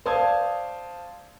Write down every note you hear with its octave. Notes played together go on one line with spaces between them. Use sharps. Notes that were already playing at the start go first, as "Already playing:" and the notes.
C5 D5 F5 A5 D#6 G#6